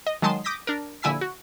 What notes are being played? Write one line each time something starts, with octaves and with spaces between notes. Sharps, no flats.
D#5
D#3 F#3 G#3 A5 C6 D#6
D6 D#6 G6 A#6 B6
D4 A#4
A#1 D3 E4 G#5 E6 B6
F#4